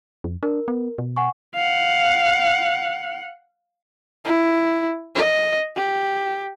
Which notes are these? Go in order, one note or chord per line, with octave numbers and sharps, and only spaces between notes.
F2
D4 A#4
B3
B2
F#5 G#5 C#6
F5 F#5
E4
D#5
G4